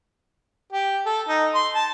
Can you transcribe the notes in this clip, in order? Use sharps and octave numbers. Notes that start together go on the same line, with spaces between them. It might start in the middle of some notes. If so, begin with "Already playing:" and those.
G4
A4
D#4
C6
A5